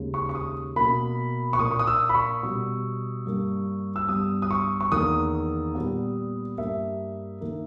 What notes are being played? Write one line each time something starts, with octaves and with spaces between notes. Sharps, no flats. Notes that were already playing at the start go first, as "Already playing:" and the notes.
Already playing: D#2 C#3 G#3
C#6
C#6
D#6
B2 A#3 B5
C#6
A#2 A#3 D#6
C#6
D#6
E6
B5
C#6
B2 G3 B3
G2 G3 A#3
E6
G2 G3 B3 D#6
D#6
C#6
C#6
E2 D#3 A#3 D#6
A#2 G3 B3
G2 G3 A#3 E5
D#3 A#3